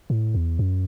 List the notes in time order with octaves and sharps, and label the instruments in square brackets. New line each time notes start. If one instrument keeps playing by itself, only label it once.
[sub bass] A2
E2
F#2